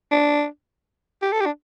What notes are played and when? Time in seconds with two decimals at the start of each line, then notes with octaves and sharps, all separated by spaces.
0.12 D4
1.22 G4
1.32 A4
1.40 G4
1.46 D4